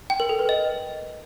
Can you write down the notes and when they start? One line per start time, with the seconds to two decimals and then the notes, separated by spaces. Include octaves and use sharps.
0.10 G5
0.20 A#4
0.29 A4
0.39 B4
0.49 D#5